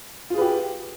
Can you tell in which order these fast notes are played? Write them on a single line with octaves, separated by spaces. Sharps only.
F4 G#4 B4 G4